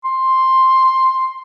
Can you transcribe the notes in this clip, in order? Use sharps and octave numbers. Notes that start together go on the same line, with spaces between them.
C6